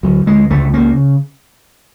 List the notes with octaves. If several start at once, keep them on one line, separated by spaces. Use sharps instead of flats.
D2 F#3
D2 G#3
C#2 A3
C#3 A#3